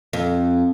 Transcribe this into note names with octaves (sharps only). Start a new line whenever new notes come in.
F2